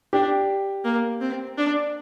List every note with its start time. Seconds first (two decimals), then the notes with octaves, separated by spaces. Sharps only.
0.13 D4 G4
0.85 A#3
1.21 C4
1.58 D4